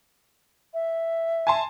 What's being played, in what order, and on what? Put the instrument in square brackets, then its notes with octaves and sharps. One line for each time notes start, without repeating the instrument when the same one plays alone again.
[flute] E5
[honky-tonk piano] G#5 A5 C6